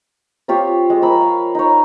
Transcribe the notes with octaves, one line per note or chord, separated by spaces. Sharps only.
C4 F4 G4 C#5
G#3
F3 A#4 B5 E6
F5
D#4 C#5